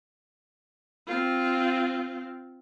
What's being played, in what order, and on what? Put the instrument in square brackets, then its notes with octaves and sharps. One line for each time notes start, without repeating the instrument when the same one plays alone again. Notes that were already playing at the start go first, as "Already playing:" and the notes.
[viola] C4 F4